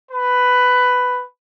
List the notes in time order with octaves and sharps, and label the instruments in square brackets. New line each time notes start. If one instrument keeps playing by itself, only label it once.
[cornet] B4